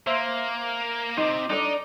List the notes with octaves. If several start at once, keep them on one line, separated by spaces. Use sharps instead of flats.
A#3 C5 E5 C6
C3 D#4 C6 D6
D4 D#4 A4 D5 D6